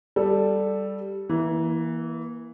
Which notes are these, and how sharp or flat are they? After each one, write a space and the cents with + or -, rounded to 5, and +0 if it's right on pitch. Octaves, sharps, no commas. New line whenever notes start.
G3 +0 A4 +0
E3 -10 A#3 +25